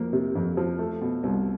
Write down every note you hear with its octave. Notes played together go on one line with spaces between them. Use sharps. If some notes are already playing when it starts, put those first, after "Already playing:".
Already playing: F2 F3 A#3
C3
F2
F3
A3
B2
C2